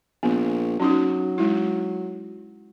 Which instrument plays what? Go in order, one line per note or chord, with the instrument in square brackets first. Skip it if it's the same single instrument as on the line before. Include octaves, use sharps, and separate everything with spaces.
[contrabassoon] A#1 [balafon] B3
[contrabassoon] F#3 [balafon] C#4 D#4 F#4
[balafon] G#3 E4